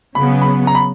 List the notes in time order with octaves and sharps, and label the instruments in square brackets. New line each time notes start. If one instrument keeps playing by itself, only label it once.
[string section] C#3 F#3 B3 [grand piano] B5
[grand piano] B5
A#5
B5